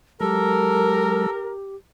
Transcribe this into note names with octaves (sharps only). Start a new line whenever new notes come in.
F#3 G#3 G4 A4 A#4